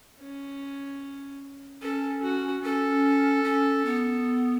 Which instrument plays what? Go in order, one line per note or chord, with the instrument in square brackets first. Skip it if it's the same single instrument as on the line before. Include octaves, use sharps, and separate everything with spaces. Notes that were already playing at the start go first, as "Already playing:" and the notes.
[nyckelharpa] C#4
[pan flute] C#4 [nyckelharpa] A4
[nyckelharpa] F#4
[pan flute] C#4 [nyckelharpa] A4
[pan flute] C#4
B3